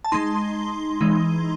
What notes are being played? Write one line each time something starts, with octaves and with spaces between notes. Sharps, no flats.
A5
G#3 D#4 C6
E3 G#3 D#4